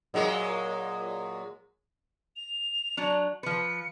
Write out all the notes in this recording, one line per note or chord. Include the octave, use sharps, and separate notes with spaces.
A#2 F#3 G#3
F7
F#3 D4
F3 B4 C#7